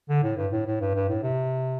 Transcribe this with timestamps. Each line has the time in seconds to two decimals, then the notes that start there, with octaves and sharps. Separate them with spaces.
0.09 D3
0.23 A2
0.37 G2
0.52 A2
0.66 A2
0.81 G2
0.95 G2
1.08 A2
1.23 C3